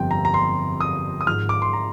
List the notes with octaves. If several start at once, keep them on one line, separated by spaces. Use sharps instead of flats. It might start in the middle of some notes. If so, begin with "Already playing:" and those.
Already playing: G1 F2 C3 G3 G5
A#5
A#5
C6
D#6
D#6
G#1 G#2 F3 F6
D6
C6
A#5